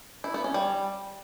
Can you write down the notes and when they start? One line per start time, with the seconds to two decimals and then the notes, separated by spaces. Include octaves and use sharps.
0.24 E4
0.34 B3
0.44 C#4
0.54 G3